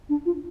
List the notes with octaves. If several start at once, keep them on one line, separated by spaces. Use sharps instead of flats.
D4
F4